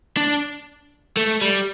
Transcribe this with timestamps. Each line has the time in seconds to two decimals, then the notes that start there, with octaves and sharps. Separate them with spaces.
0.17 D4
1.17 A3
1.41 G3